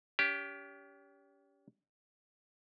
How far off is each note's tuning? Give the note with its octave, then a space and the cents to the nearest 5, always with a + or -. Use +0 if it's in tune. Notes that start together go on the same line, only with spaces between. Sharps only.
C#4 +40 G4 +0